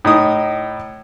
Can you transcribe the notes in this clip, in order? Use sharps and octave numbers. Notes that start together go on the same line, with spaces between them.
A2 D#4 D#6